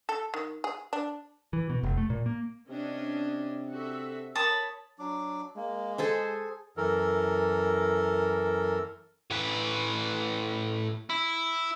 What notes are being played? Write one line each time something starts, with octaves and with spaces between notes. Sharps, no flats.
A4
D#3
G#4
D4
E3
B2
F1
A3
A#2
A#3
C3 C#4 D4 D#5
F#4 A4 E5
A#4 C#5 A5 B5 D#6
F#3 D4 D6
G#3 A#3
G#4 A4 C5 G#5
F#2 E3 A4 A#4
A2 B4
E4